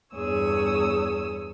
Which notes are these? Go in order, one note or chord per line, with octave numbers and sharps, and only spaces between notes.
E2 G2 G#4 C#5 D#6 E6